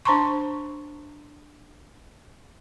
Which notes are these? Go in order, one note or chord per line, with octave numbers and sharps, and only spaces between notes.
D4 C5 A5 A#5 C6 C#6